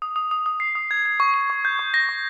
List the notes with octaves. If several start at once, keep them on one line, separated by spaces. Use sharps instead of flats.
D#6
D#6
D#6
D#6
C7
D#6
G#6
G#6
C#6
C#6
C#6
G6
C#6
A#6
C#6